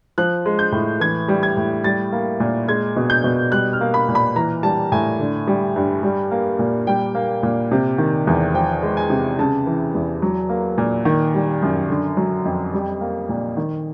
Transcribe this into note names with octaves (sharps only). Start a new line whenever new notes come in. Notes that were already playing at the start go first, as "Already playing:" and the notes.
F3 F#6
G#3
G6
A2
E3 G#6
G3
G#6
A2
G3 A6
A#3
A#2
G#3 G#6
B2
G6
B2
G3 F#6
F6
A#3
B5
A#2
B5
E3 A#5
G3 A5
A2 G#5
D3
G3
G2
G3
A#3
A#2
G3 G5
A#3
A#2
C3
D#3
E2
F3 G5
G#3
G#5
C3
C#3 A5
E3
E2
F#3
A#3
A#2
D#3
G3
F#2
D3
F#3
F2
G3
A#3
A#2
D#3